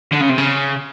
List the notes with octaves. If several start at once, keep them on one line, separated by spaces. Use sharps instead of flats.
D3
C#3
C3
C#3